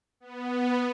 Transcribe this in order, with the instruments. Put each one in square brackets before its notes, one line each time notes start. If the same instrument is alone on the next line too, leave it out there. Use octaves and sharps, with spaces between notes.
[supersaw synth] B3